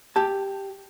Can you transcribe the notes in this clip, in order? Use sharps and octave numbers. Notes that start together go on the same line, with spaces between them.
G4 A5